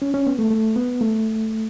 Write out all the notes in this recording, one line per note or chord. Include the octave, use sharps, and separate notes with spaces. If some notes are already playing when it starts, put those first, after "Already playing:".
C#4
C#4
B3
A3
A3
B3
A3